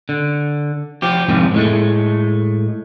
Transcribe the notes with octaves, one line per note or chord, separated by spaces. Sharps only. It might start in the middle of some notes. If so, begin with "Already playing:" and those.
D3
F3 G4
F2 G#2 C3 D#3 F3
A2 G#3 A3